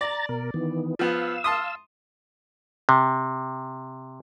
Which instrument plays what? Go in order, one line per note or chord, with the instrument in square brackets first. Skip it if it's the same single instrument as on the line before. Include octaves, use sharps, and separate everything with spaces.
[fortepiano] D5 [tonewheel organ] A#5 A6
[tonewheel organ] B2 A#4
D#3 E3 B3
[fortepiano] F3 B3 [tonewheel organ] F5 E6
[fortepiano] A5 C6 D#6
[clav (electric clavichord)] C3